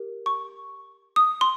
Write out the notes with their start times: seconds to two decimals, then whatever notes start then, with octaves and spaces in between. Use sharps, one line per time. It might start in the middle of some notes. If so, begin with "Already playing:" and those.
Already playing: G4 A#4
0.26 C#6
1.16 D#6
1.41 C6